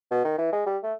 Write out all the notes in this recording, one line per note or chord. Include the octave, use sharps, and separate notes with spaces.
B2
D#3
E3
G#3
G3
A3